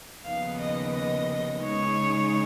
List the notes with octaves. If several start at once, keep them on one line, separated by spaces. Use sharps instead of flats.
D#2 C#3 F3 B3 D#4 F5
D#5
D#5
C#3 G#3 D#4 C#5